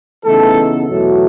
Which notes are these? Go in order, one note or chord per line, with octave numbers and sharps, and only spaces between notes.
C#3 E3 A3 B3 D#4 A4
E2 B2 F#3 A3